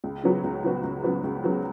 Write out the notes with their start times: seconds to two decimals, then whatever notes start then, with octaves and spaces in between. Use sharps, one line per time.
0.04 C#2
0.23 C#3 F#3 B3 F#4
0.44 C#2
0.64 C#3 F#3 B3 F#4
0.84 C#2
1.03 C#3 F#3 B3 F#4
1.24 C#2
1.44 C#3 F#3 B3 F#4